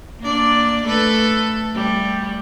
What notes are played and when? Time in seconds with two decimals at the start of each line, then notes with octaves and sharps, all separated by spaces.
0.20 A#3 D4 D5
0.85 A3 A4 B4
1.74 G3 A3